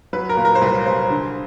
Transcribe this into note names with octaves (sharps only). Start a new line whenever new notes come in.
F#3 B4
A#4
A#2
A#4
C5
C2 B4
C2 C5
D3